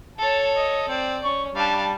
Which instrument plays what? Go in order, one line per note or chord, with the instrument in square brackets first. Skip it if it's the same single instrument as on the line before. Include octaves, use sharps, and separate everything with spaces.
[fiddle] A4 C#5 [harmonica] A5
[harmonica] D#5
[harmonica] C4 [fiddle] D5
[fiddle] C#4 [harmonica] C#6
[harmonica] G3 D4 [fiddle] F5 A5